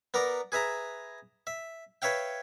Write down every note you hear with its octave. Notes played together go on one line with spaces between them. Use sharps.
B3 A#4 D5 A#5
G#4 B4 E5 A#5
E5
B4 C#5 E5 F5 G5